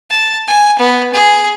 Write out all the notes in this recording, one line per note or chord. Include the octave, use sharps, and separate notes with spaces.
A5
G#5
B3
G#4